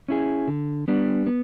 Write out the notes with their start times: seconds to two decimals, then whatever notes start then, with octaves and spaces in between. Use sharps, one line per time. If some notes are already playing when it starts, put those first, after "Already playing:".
0.08 C#4 E4 G#4
0.48 D3
0.88 G3 B3 D4
1.27 B3